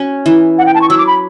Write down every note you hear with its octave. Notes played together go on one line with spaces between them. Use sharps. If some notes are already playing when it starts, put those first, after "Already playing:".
Already playing: C#4 F#4
E3
F#5
G5
A5
C#6
F#3 E6
D6
B5